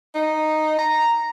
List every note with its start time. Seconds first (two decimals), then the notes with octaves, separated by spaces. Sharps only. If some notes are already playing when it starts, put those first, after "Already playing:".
0.15 D#4
0.78 A#5